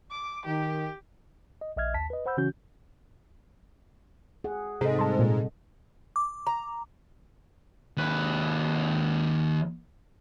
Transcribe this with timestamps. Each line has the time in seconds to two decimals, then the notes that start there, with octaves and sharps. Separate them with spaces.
0.10 D6
0.45 D#3 G4
1.61 D#5
1.77 A#1 D#5 E5 F6 G#6
1.94 D#2 A5 B6
2.10 B4 D#5
2.26 C5 F#5 B5 E6 G6
2.37 C#3 E3 C#4 F#4 G6
4.44 G#4 F#5
4.81 G#2 C3 A4 D#5
4.99 G3 A5 C6
5.19 A#2
6.16 D6
6.47 A#5
7.97 D#2 B4